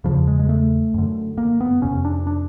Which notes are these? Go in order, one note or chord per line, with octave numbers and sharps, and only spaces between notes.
E2 C#3 F3
G#3
G#3
A3
F#2 D3
A#3
B3
F2 C3 C#4
D4
D4